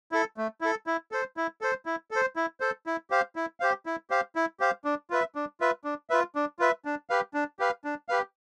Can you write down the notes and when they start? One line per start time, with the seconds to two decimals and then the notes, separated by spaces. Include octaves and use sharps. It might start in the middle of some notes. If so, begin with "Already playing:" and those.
0.12 E4 A4
0.37 A3
0.61 E4 A4
0.87 E4
1.12 A4 C5
1.37 E4
1.61 A4 C5
1.86 E4
2.11 A4 C5
2.36 E4
2.60 A4 C5
2.86 E4
3.10 G4 C5 F5
3.36 E4
3.60 G4 C5 F5
3.86 E4
4.10 G4 C5 F5
4.36 E4
4.60 G4 C5 F5
4.85 D4
5.10 F4 B4 E5
5.35 D4
5.60 F4 B4 E5
5.84 D4
6.10 F4 B4 E5
6.35 D4
6.59 F4 B4 E5
6.85 D4
7.10 G4 B4 F5
7.34 D4
7.59 G4 B4 F5
7.85 D4
8.09 G4 B4 F5